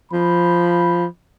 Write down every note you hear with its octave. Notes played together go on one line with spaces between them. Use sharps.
F3 B5